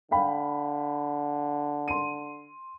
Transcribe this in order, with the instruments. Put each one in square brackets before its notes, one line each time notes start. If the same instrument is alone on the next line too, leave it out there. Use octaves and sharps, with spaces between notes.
[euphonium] D3 [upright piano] F5 G5 B5
[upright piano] C6 D#7